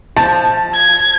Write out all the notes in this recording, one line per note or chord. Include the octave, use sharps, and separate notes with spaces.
F3 A5
G#6